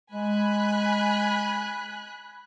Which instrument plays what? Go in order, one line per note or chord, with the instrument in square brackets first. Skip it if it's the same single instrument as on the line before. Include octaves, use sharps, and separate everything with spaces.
[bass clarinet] G#3 [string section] G#5 B5 F#6